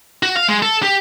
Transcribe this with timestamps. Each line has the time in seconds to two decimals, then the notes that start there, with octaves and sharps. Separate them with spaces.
0.23 F#4
0.36 F5
0.48 G#3
0.62 A4
0.83 G4